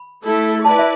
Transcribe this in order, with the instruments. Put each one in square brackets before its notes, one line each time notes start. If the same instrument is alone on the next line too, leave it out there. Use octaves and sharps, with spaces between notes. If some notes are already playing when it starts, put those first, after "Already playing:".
Already playing: [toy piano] B5
[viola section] A3 E4 A4
[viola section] E4 B4 D5 [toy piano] A5
[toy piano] E5